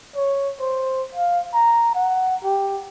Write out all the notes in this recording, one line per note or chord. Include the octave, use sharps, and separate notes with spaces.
C#5
C5
F5
A#5
F#5
G4